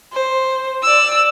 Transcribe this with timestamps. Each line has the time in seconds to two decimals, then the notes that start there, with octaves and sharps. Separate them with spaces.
0.12 C5
0.82 D5 E6